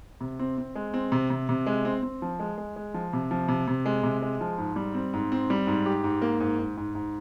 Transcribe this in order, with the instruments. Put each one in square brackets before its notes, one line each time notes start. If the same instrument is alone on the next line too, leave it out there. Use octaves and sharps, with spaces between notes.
[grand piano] C3
C4
C4
G#3
C4
C3
C3
C3
G#3
C4
C4
F3
G#3
G#3
G#3
F3
C3
F3
C3
C3
G#3
C3
G#3
F3
G#2
G3
C4
G#2
C4
G3
G#2
G4
G#2
A#3
G#2
G#2
G#2
G#2